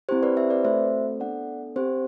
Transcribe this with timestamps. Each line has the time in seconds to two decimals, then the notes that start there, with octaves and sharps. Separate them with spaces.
0.09 C4 E4 G4 C5
0.23 B4 D5
0.37 C5 E5
0.50 B4 D5
0.65 A3 C4 F#4 A4 C5 E5
1.20 B3 D4 A4 D5 F#5
1.76 C4 G4 C5